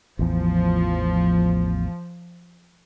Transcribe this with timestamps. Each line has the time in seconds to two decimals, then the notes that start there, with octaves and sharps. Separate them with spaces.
0.19 A1 E2 F3